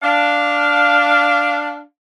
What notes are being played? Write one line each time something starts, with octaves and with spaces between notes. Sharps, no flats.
D4 F5